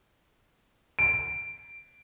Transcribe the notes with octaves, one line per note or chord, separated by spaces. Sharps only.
D7